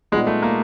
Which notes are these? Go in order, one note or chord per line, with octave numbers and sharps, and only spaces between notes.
A#2 G3 G#3 B3 D#4
A3
A#3